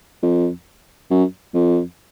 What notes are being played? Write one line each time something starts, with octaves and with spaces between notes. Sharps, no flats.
F2
F#2
F2